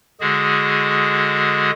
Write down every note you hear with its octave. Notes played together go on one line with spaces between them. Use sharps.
D3 G#3 F#4 G#4